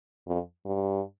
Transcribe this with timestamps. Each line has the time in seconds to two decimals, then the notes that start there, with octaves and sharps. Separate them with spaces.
0.27 F2
0.65 G2